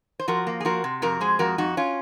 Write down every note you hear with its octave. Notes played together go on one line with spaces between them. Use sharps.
C5
F3 F#4 A#4
A#3
G#4
F3 F#4 A#4
C3
F2 F#4 A#4
G#3 G#4 C5
F2 F#4 A#4
F2 D#4 F#4
C#4 F4